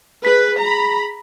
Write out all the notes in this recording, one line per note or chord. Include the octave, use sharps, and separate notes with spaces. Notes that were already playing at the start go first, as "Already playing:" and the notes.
G#4 B4 B6
A#5 B5